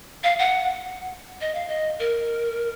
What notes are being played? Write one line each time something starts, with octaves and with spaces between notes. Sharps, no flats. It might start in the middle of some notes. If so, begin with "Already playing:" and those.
F5
F#5
D#5
F5
D#5
A#4